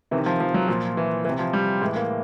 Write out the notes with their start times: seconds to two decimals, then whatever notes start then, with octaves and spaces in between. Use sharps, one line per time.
0.11 C3 D#3 E3
0.26 F3
0.40 F3
0.54 F#3
0.68 A#2 F3
0.97 E3
1.25 E3
1.29 C3
1.39 F3
1.53 G3
1.81 A2 E3 G#3
1.96 A#3